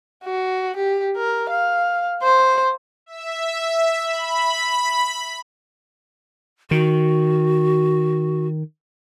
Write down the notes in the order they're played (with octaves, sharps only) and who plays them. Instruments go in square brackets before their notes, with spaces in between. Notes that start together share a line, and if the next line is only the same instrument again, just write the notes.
[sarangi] F#4
G4
A#4
F5
C5
[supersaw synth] E5
B5
[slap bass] D#3 [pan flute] F#4